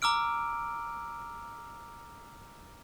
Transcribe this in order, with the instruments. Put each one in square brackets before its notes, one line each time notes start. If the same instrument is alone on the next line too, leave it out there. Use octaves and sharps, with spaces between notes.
[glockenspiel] A#5 D6 E6 F6 D7